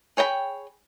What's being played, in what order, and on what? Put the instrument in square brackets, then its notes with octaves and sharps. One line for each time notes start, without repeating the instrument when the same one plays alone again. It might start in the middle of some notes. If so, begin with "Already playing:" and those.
[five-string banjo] G#4 C#5 G5 A#5 B5